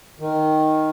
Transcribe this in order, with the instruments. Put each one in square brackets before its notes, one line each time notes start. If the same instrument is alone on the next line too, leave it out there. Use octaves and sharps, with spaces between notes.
[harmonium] D#3